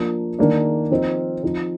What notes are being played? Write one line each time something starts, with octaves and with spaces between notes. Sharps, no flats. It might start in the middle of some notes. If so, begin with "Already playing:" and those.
Already playing: F3 A#3 D4
D#3 A#3 D4
F3 C4 D#4
F3 C4 D#4